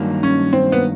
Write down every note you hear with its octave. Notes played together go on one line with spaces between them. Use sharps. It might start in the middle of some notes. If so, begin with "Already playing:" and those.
Already playing: G2 D#3 F#3 A#3
C#4
C4
B3